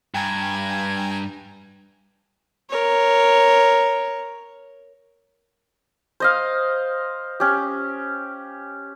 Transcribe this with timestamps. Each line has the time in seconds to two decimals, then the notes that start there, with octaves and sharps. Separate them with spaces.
0.14 G2 G5 G#5 A#5 G#6
2.69 A#4 C#5
6.20 C5 D#5 F5
7.40 C#4 G4